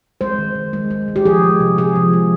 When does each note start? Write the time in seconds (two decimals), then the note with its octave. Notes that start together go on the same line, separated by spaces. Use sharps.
0.21 G#3 C5
0.38 D#3
0.55 D#3
0.73 G#3
0.91 G#3
1.08 D#3
1.16 G4
1.25 F3 G#4
1.43 G#3
1.60 C3
1.78 C3 G#4
1.96 F3
2.13 G#3